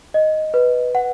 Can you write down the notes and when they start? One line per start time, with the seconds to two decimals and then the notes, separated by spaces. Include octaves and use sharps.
0.14 D#5
0.54 B4
0.95 F#5